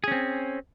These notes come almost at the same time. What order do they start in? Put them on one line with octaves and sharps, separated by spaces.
G#4 C#4 C4